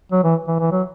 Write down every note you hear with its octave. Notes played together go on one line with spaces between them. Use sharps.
F#3
E3
E3
E3
F#3